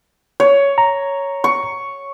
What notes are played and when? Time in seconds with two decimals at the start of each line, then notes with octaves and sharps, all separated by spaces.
0.40 C#5
0.78 A#5
1.44 C#6